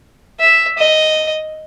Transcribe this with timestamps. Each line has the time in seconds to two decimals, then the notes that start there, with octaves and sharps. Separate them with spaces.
0.40 E5
0.78 D#5